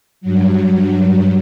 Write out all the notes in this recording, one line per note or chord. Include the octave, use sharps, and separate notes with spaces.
G2 F#3